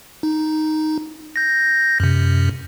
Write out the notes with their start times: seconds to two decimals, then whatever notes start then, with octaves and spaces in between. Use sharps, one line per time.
0.23 D#4
1.36 G6 A#6
2.00 F#2 C3